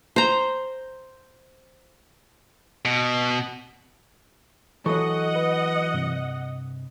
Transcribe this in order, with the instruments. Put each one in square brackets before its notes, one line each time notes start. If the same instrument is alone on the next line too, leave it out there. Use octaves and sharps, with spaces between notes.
[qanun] C5 A#5
[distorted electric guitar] B2
[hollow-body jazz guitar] E3 F#3 [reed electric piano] A4 C#6 [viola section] D#5 F#5
[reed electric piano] B4
G2 C3